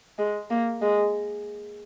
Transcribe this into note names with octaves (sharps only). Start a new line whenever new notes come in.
G#3
A#3
G#3